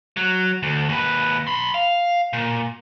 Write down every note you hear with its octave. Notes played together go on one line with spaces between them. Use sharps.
F#3
D2
D#2 B4
B5 C6
F5
A#2